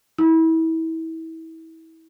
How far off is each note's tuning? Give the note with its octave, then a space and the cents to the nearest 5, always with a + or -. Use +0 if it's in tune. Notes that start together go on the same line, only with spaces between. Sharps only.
E4 -30